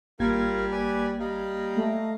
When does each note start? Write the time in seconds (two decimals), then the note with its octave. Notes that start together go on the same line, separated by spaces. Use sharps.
0.20 G#1 G3 A#3 F4 A#4 G#6
0.72 B4 D5 G#5
1.20 G3 D#5 F5 A#5
1.77 A3